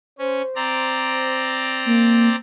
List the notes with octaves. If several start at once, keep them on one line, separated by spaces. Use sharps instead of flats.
C#4 C5
C4 D5 A#5
A#3